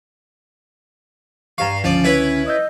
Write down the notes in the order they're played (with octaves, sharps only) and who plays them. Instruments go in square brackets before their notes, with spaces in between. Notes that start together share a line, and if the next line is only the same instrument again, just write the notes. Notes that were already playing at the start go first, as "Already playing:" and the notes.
[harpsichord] G2 F5 [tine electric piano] A#5 C#6
[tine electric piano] C#2 D3 [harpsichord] F3 D5 [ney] C#4
[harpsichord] E4 B4 C#5
[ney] D#5 [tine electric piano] D#6 E6 G6